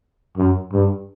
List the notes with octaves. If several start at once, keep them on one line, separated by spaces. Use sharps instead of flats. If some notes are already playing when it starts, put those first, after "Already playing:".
F#2
G2